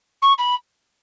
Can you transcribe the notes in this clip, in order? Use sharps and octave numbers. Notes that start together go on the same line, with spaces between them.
C#6
B5